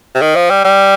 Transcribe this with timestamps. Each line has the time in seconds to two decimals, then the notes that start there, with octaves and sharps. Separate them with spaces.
0.15 C3
0.21 D#3
0.36 F3
0.50 G3
0.65 G3